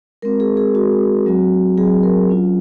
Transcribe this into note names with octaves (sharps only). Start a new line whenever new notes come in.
G#3 C4 F#4 A#4
G#4
G#4
G#3 C4 F#4
F#3 C4 F#4
F#3 C4 F#4 G#4
A#4
F#3 C#4 F4